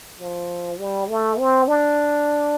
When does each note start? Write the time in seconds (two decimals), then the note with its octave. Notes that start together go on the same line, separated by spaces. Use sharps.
0.20 F3
0.80 G3
1.09 A3
1.39 C4
1.68 D4